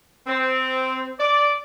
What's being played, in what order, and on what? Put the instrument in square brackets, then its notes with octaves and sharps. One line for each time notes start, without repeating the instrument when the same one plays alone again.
[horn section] C4
D5